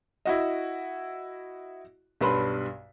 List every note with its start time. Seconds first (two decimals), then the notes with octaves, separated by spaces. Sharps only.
0.25 E4 F#4 D#5
2.21 B1 G2 B4 B5 C6